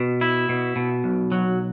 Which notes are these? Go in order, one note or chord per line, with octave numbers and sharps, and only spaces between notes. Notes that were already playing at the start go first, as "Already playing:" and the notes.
Already playing: B2
E4
B2
B2
B1
F#3